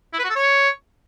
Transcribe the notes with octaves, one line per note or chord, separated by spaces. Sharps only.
E4
B4
F#4
A4
C#5